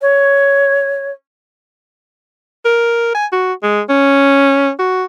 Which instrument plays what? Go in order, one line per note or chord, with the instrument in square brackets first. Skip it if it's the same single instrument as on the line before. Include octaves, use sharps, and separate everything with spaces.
[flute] C#5
[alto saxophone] A#4
G#5
F#4
G#3
C#4
F#4